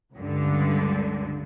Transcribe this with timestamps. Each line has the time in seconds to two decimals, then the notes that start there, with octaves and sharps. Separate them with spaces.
0.15 C#2 G2 D3